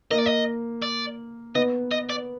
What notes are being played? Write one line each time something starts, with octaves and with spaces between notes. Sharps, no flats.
A#3 D#5
D5
D#5
D5
B3 D#5
D#5
D5